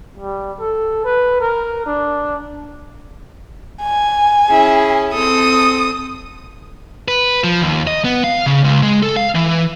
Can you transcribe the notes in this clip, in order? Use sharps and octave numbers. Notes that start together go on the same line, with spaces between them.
G3
A4
B4
A#4
D4
G#5
C#4 E4 G#4
C4 A4 D#6
B4
F3
D#2
D#5
B3
F5
C#3
C#2
G#3
A4
F5
E3